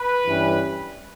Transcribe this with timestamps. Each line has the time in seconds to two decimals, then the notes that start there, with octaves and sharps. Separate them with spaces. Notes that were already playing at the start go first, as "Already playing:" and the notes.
Already playing: B4
0.25 G2 E3 G3 C#4